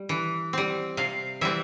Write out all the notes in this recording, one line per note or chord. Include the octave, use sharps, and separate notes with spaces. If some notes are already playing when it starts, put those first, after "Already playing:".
Already playing: G3
E3
G3 C4
C3 F5
E3 G3 C4 E5